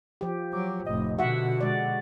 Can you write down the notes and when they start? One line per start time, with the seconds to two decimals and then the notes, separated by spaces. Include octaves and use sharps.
0.21 F3 G4
0.53 F#3 D6
0.86 F1 A2 D#5
1.19 B2 D3 F#4 E5 F#5
1.60 G#3 D5